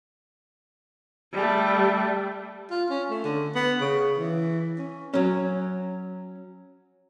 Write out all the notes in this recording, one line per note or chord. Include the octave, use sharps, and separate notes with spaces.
G3 A3
F4
C#4
A3
D3
B3
C#3
E3
C#4
F#3 C#4